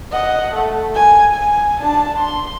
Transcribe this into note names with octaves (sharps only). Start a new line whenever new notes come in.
D#5 F#5
A3
G#5
G#5
D4 A5
C6